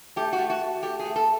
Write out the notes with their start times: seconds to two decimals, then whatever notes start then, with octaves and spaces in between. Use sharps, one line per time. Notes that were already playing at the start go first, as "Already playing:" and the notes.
0.16 A3 G4
0.33 F#4
0.39 A3
0.50 F#4
0.61 A3
0.83 A3 G4
0.99 G#4
1.05 A3
1.16 A4